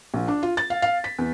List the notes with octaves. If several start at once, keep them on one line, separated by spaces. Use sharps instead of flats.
A#1
D4
F4
A6
F5
F5
B6
E2